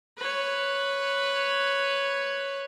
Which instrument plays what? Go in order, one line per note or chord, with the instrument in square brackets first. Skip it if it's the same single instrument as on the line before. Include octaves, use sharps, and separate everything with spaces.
[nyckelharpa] B4 C#5